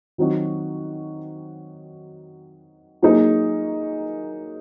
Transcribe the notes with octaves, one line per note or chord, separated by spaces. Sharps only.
D#3 F#3 C4 D#4 F#4
F#3 A#3 D#4 G#4